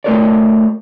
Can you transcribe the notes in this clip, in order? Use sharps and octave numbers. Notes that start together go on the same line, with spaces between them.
A3 C#4 F#4 A#4 C#5 D5